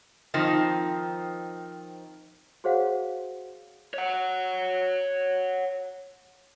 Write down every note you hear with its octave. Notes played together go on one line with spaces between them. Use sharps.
D#3 F3 C4 D#4
F#4 G#4 C5 C#5 F5 F#5
C#5 F#5